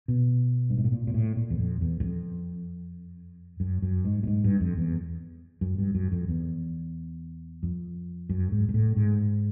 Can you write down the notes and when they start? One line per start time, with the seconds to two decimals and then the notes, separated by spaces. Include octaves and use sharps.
0.08 B2
0.70 G2
0.78 G#2
0.84 A2
0.92 A#2
1.07 A#2
1.14 A2
1.37 A#2
1.50 E2
1.59 F2
1.81 E2
2.00 F#2
2.03 F2
3.60 F#2
3.82 F#2
4.05 G#2
4.23 A2
4.27 G#2
4.44 G2
4.61 F2
4.77 E2
5.61 F#2
5.78 G2
5.95 F#2
6.12 F2
6.28 E2
7.63 F2
8.29 F#2
8.52 G#2
8.69 G#2
8.74 A2
8.96 G#2